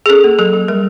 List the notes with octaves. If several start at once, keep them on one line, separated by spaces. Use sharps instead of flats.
G#4
C#4 A4
A#3
F#3 A4
F#3
G3 A#4